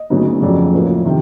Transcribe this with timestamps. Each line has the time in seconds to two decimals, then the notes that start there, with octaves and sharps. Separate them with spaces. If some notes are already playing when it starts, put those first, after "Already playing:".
Already playing: D#5
0.10 D2 C#3 F#3 B3 D#4
0.42 F2 C#3 F#3 D5
0.74 A2 F3 A#3 B4
1.05 C3 D#3